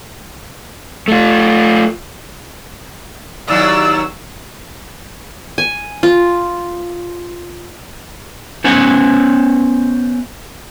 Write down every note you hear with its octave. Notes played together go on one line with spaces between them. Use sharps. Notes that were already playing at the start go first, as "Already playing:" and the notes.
A3 F4
D#2 F#3 E4 F4 D5 E6
G#5
F4
B3 C#4 C5 E5 F#5